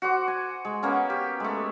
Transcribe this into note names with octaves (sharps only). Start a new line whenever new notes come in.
F#4 C5 D6
G#5
G#3
A#3 B3 C#4
G4
G#3 A3